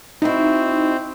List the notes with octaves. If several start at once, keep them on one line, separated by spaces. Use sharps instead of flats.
C4 D#4 E4 F#4